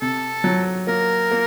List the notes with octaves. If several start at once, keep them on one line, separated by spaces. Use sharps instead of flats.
C3 A4
F#3
A#3 A#4
A#3